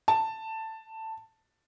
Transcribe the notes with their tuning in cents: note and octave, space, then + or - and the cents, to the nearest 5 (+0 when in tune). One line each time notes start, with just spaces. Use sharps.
A5 +10